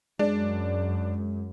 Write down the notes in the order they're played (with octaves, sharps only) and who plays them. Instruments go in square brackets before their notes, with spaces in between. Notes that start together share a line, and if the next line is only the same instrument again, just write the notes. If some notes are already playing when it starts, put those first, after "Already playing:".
[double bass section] F#2 [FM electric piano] G#3 [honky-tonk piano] D4